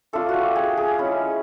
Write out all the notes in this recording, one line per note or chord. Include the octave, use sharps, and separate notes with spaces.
A3 D4 F4 A4
F#4
G4
G#4
G#4
G#3 C#4 E4